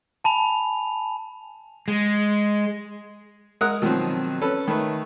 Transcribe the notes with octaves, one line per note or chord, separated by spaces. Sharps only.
G#5 A5 B5 F7
G#3
G#3 A#4 F#5 D#6 F#6
B2 D#3 F3 F#3 C4
C#4 A4 B4
D#3 A3 B4